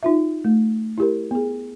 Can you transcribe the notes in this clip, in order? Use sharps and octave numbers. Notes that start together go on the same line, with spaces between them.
D#4 F4 E5
A3
E4 G4 A#4
B3 G#4